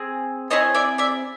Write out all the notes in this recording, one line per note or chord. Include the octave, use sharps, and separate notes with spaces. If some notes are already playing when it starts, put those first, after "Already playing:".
Already playing: C4 G#4
C4 E4 G#4 C#5 D#5
D5 E5
D5 E5